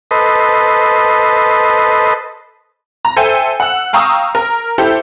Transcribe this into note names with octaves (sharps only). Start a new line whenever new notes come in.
A4 B4 C5 D#5
A#5
A4 C5 E5 G5 G#5
F#5 E6
F5 G5 A#5 C#6 D#6 E6
A#4
E4 G4 A4 C5